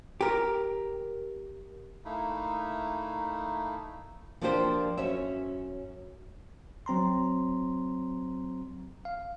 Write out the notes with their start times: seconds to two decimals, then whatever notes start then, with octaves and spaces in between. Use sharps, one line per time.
0.21 G4 A#4
2.05 A3 A#3 D#4 E4
4.41 F3 A#3 D4 E4 G4 C5
4.97 F#2 C#4 C#5 E5
6.86 F#3 C4 A#5 C6
9.05 F5